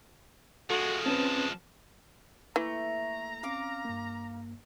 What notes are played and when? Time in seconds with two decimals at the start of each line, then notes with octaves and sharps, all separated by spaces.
0.70 F3 G#3 F#4 A4
1.06 C4 C#4 B4 A5
2.56 E3 A3 A#3 A#5
3.43 C4 C#4 F5 D6
3.85 G2 A#3